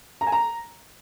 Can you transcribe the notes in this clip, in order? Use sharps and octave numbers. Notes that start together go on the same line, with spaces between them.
A#5
G#5
A#5